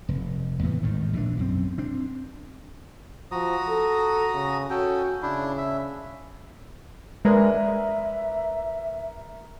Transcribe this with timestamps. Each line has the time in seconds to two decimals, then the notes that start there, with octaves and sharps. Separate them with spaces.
0.09 F1
0.63 E2 A2 E3 B3
0.83 G#1 A2 D#3
1.13 A#1 E3 C4 D4
1.37 B1 F#2 C4
1.78 C4 D4
3.31 F3 F#4 A#5 D#6
3.69 A4
4.34 C#3
4.70 C#4 F#4 A4 G5
5.22 C#3 D4 E4
5.58 E5
7.25 G#3 D4 A#4 B4 E5